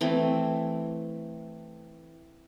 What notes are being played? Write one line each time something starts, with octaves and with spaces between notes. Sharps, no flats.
E3 A3 C4